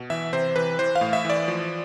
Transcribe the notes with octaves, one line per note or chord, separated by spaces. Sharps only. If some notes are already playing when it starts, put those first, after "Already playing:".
Already playing: B2
E3 E5
C3 C5
E3 B4
E3 C5
F5
A2
E5
E3 D5
F3